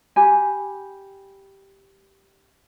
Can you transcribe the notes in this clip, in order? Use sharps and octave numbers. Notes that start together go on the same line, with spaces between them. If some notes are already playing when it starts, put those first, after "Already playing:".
G4 G#5 B5